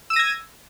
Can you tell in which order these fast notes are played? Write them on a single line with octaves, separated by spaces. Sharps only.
E6 D#7 A#6 G#6